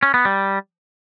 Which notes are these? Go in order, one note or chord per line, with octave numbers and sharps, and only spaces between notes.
C#4
B3
G3